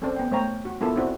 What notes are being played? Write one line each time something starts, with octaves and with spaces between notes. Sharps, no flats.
C4 C#4 A4 C5 D5
B3 G5
A3 C5 C#5 F5 G5 A#5
F#4
B3 E4 F4 A4 A#4
C4 E4 F#4 D5